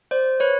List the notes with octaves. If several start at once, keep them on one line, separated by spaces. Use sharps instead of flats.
C5 D5
B4 C#5